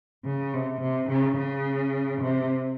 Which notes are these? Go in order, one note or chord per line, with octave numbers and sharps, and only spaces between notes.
C#3
C3
C3
C#3
C#3
C3